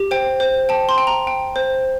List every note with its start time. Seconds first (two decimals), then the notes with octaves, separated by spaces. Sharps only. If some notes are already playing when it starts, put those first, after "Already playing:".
Already playing: G4
0.11 C5 G5
0.40 C5
0.69 G5 A5
0.89 C6
0.98 G5
1.07 A#5
1.27 G5
1.56 C5